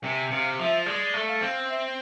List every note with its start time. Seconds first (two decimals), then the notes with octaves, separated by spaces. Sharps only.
0.03 C3 G#5
0.31 C3 F5
0.59 F3 E5
0.86 G#3 D5
1.14 A3
1.28 F5
1.41 C4
1.69 E5